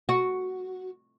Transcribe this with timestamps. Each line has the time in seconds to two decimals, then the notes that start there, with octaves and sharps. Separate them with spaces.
0.09 F#4